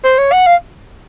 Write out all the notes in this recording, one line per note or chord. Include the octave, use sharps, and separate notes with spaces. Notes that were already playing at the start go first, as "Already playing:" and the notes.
C5
C#5
F#5
F5